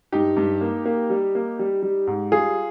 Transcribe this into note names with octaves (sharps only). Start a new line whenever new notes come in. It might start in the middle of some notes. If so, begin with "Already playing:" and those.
G2 D#4 G4
G2
A#3
A#3
G3
A#3
G3
G3
G#2
G3 F4 G#4